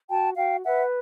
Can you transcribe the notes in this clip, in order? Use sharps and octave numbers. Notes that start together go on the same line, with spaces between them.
F#4 G5 A5
F#4 F5 G5
B4 E5 F#5